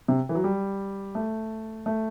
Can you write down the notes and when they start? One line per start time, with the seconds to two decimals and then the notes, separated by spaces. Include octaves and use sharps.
0.08 C3
0.29 E3
0.35 F#3
0.44 G3
1.15 A3
1.86 A3